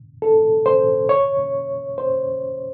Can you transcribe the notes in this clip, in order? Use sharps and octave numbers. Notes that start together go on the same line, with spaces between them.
A4
C5
C#5
C5